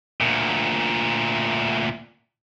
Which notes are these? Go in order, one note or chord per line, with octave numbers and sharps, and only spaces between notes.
D2 A#2